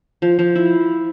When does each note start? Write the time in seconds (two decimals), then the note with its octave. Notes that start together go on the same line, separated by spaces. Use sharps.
0.22 F3
0.39 F3
0.55 E4